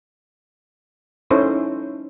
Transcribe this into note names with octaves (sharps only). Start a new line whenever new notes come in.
C#4 D#4 E4 A4 C5 C#5